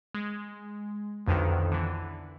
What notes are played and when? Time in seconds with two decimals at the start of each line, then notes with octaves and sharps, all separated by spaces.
0.15 G#3
1.26 B1 F2 D3 D#3
1.72 D3 E3